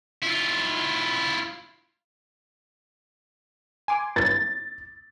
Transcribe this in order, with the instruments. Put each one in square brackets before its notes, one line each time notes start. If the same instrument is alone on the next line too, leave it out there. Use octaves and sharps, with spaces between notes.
[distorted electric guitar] E4 F4
[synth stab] G#5 C6 D6
[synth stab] G2 [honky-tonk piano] A6